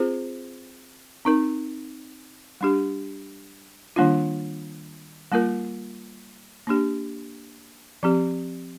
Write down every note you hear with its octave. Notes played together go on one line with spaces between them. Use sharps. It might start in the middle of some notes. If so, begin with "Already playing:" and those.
Already playing: C4 F4 G#4 C5
C4 D#4 A#4
G3 D4 G4
D#3 G3 A#3 D4 F4
G3 A#3 F4 A#4
A#3 D4 G4
F3 C4 G4